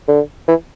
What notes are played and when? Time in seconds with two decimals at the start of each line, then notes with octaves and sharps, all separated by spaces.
0.08 D3
0.48 E3